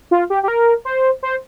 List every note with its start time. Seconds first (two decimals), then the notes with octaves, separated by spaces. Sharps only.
0.11 F4
0.30 G4
0.43 G4
0.48 A#4
0.85 C5
1.23 C5